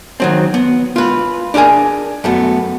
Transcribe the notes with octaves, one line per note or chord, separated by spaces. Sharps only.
D#3 F#3 C4
B3
F4 B4
D4 D#4 G#4 A#4 G#5
F#2 A3 B3